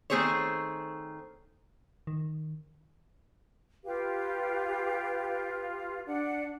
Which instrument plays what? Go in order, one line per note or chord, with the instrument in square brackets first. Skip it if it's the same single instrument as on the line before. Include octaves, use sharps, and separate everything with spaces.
[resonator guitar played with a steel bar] D#3 A3 C4 G#4 C5 C#5
[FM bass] D#3
[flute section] F4 G4 B4 F5
D4 F#5